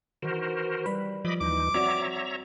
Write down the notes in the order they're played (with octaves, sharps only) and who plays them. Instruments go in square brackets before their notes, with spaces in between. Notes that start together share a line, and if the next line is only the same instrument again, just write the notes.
[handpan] D#3 E3 [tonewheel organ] F#4 A#4 C5
[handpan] G3 B4 [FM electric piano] B5
[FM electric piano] F3 [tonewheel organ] D#5 B5 D6
[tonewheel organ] D#2 E3 D#4 [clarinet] D6
[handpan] C4 F#4 D5 [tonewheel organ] C#5 E5 A#5